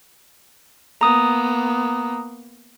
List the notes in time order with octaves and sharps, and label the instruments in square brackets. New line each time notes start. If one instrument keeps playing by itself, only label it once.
[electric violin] A#3 B3 [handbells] A#5 D#6